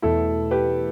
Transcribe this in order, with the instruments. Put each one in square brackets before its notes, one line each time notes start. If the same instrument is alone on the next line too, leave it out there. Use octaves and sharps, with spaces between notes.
[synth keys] E2 B2 A3 [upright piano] E4 A4
[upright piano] G4 B4